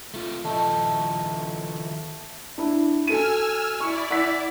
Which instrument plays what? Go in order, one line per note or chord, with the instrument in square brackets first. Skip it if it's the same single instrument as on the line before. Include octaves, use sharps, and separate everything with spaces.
[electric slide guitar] A3 F4
[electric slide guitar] D#3 F3 D#5 [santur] A3
[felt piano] D4 E4
[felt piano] F#4 A4 D#7 [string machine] G#5 E6 F6
[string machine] E4 D5 [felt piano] C#6
[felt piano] F#5 E6 B6